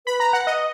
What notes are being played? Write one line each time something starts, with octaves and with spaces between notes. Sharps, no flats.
B4 B5
A#5
F#5
D#5